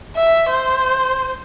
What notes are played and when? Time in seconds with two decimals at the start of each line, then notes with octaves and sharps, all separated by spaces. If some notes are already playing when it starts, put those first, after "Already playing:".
0.16 E5
0.50 C5